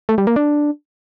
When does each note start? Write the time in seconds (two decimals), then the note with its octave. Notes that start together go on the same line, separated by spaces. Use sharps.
0.09 A3
0.18 G3
0.27 A#3
0.36 D4